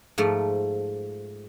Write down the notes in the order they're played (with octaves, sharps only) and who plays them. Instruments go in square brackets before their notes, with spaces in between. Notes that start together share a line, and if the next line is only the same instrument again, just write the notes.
[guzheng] G#2 F3 A3